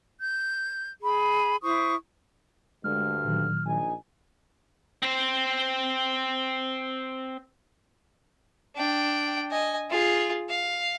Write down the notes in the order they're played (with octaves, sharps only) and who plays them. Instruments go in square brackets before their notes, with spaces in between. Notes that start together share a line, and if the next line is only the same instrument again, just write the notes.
[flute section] G6
G#4 B5
E4 C5 C#6 D#6
[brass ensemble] D2 G2 D3 [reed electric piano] G#3 [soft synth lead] F6
[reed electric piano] A#2 D#3 F#3
[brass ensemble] A#1 D#4 G#5
[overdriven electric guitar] C4 C5
[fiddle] D4 G5
D#5 G#5
F4 G#4
F5